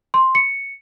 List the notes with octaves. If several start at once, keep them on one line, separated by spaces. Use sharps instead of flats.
C6
C#7